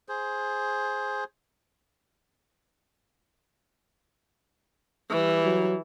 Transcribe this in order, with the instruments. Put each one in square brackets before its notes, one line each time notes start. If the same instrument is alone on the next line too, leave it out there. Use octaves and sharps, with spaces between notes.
[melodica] G#4 C5
[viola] E3 G3
[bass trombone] F#3